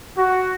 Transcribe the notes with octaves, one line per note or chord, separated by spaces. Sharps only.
F#4